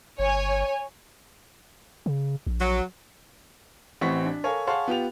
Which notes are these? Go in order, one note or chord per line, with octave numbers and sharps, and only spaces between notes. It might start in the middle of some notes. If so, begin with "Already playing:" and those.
G1 C#5 G#5
C#3
A#1
F#3
A1 E3 C4 F#5 C#6 B6
D4
A4 A#4 C#5 F5 G#5
G#4 C#5 F5 F#5 A5 C6
B3 F4 G4 F7